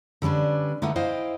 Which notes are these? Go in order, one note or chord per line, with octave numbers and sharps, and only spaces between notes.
D3 G3 C#4 D4 B4
D3 A3 D#4 E4 B4 F#5
E4 C5 D#5 F5 G5